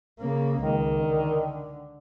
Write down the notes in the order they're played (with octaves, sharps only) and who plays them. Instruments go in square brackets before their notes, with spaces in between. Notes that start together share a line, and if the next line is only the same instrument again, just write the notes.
[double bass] C#3 A#3
[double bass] C#2 [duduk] D#3
[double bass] D3